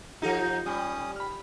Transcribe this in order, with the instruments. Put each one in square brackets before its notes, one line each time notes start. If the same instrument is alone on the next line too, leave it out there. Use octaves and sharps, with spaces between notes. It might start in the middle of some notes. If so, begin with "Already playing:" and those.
[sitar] F3 D#4 [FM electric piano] F4 G4 A4 [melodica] A#5
[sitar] G3 [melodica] C#4 D#6
[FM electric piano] B5 F6